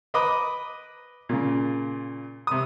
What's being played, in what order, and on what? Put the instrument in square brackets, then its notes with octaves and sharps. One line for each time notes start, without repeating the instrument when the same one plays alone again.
[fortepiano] B4 D#5 A#5 B5 D6 D#6
A#2 C#3
C3 D#6